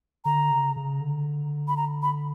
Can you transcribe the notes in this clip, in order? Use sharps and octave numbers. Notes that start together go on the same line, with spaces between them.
D3 A#5
C#3
C#3
D3
B5
A#5
B5